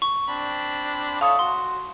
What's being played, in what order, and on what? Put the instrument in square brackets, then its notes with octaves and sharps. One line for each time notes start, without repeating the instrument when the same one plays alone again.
[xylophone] C#6
[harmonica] C4 D4 B5
[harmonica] E4 A4 C#5 [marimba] F5 D#6
[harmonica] F#4 [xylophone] C6